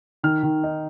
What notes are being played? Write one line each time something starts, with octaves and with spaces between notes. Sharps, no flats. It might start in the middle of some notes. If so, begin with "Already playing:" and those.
D#3 F6
D#3
D#4